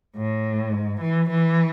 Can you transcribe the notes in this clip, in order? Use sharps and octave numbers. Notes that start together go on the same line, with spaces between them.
A2
G#2
E3
E3